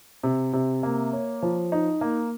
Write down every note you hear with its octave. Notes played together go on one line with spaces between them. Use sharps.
C3
C3
A#3
C#5
F3
D#4
A#3